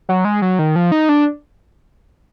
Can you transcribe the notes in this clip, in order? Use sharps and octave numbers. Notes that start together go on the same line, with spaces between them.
F#3
G#3
F#3
D#3
F3
D#4
D4